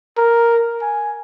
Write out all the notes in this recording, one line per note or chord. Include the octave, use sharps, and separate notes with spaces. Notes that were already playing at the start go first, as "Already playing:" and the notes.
A#4
G#5